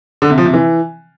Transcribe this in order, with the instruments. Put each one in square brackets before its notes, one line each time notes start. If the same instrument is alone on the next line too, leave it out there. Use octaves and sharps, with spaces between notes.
[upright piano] D3
C3
F3
C3
E3